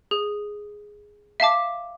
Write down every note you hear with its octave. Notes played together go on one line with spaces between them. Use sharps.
G#4
E5 F5 A5 D6